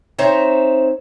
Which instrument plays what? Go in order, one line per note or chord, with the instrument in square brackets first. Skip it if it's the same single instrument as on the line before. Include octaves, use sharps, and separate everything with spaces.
[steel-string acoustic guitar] C4 D#4 C5 C#5 E5